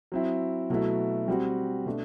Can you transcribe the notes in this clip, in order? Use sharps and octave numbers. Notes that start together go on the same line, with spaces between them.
F#3 C4 E4
B2 F#3 A3 E4
G3 C4 F#4
B2 A3 D4